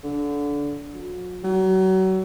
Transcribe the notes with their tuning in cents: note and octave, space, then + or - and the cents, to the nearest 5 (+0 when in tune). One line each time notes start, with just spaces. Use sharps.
D3 -25
F#3 -40
F#3 +30